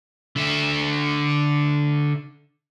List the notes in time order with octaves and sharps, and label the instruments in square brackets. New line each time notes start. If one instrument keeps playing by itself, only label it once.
[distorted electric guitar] D3 E5